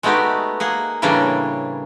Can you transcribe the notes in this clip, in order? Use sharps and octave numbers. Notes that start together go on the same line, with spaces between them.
G#3 A3 B3 D#4 F#4 G4
A#3 G#4 F#5
A2 C#3 E3 G3 A#3 D4